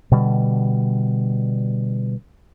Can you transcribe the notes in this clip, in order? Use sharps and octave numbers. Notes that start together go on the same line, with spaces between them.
B2 D3 G3